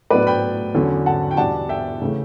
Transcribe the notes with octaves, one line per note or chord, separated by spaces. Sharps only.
A2 F#3 B3 D4 B4 D5
G5 B5
E2 D3 F#3 C#4
F#5 A5
G5
E2 B2 G3 D4 F#5 A5
E5 G5
C#3 E3 A3 C#4